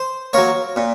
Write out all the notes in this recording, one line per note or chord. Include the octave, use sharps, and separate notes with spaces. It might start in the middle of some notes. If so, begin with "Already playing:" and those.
Already playing: C5
F#3 A#3 C#5
A#2